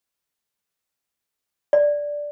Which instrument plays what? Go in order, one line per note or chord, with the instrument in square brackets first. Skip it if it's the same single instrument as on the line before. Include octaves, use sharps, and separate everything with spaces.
[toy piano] D5